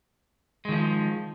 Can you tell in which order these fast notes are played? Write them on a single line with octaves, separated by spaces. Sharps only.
G#3 D#3 F3